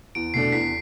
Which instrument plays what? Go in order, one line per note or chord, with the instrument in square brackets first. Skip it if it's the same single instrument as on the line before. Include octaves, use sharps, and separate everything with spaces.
[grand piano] E2 [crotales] D7
[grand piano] B2 A3 D4 [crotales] C7
[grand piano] E2 [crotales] B6